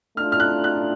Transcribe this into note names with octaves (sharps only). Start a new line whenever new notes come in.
A3 D4 F4 F6
F6
F#6
F#6